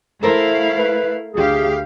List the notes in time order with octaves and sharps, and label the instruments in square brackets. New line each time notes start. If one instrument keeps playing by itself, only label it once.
[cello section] A3 E4 F5 [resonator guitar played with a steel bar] A4 A#4 C5
[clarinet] B4
[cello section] D2 G4 F5 [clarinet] G#4